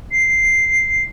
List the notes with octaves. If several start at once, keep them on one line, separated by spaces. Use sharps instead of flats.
C7